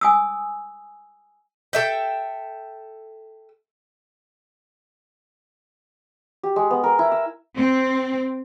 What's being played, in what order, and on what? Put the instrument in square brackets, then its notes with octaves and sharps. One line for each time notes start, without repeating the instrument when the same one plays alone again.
[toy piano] G#5 D#6 E6
[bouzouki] A4 E5 G5
[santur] G4
G#3
B3
A#4
E4
E6
[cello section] C4